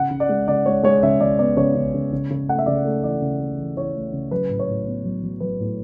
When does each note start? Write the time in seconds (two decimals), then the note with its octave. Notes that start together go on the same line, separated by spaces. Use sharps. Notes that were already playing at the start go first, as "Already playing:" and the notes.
Already playing: C#3 F#5
0.11 C#3
0.20 D5
0.29 G#3
0.48 C#3 D5
0.66 G#3 C#5
0.83 G#3 C#5
1.03 C#3 E5
1.20 C#3 D5
1.39 B3 D5
1.57 C#3 C#5
1.75 C#3
1.94 C#3
2.13 C#3
2.30 C#3
2.49 A3 F#5
2.59 E5
2.66 C#3 D5
2.85 A3
3.04 E3 D5
3.21 C#3
3.40 A3
3.58 E3
3.77 E3 C#5
3.95 A3
4.13 C#3
4.31 F#3 B4
4.49 A2
4.59 C#5
4.69 A2
4.86 B3
5.04 F#3
5.23 F#3
5.40 F#3 B4
5.60 A2